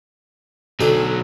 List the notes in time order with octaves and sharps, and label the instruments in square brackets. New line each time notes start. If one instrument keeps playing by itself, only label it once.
[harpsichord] D2 A4 [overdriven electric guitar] B2 F#3